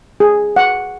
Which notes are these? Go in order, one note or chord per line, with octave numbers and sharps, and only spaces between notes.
G#4
F#5